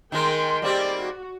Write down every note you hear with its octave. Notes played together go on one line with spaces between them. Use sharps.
D#3 G#3 A#4 G5 C6
G3 A#3 C4 G4 D5
F#4